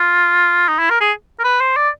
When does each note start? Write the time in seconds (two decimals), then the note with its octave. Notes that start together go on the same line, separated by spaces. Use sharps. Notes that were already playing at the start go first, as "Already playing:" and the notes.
Already playing: F4
0.68 D#4
0.79 E4
0.90 A#4
1.01 G#4
1.39 A#4
1.44 B4
1.61 C5
1.76 D5